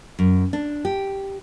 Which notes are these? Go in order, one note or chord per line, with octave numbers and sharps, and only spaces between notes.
F#2
D4
G4